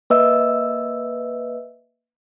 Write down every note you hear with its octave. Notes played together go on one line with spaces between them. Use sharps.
A#3 B4 D#5 E5 E6